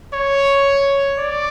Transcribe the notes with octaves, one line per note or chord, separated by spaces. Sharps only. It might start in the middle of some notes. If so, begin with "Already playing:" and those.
C#5
D5